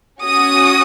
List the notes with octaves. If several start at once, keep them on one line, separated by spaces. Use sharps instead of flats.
C#4 F#4 D#6